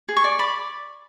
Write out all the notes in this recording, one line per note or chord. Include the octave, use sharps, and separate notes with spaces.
G#4
C#6
D5
D5 B5